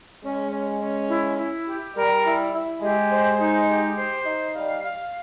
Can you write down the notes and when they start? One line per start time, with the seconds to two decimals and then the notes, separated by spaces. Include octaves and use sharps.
0.22 G#3 C#4
0.51 C#4
0.80 C#4
1.09 E4
1.38 E4
1.66 G4
1.95 G3 A#4
2.24 E4
2.53 E4
2.81 G#3 G4
3.10 C5
3.39 D#4
3.68 G4
3.97 C5
4.25 D#4
4.54 G3 F5
4.83 F5